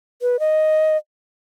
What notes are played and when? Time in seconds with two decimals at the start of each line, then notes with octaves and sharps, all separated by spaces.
0.22 B4
0.40 D#5